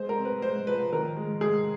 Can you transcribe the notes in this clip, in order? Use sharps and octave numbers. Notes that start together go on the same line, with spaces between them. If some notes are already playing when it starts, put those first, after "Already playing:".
Already playing: G#3 C5
A#4
C4
B4
G#3 C5
F3 B4
D#3 A#4
G#3
G#3 G#4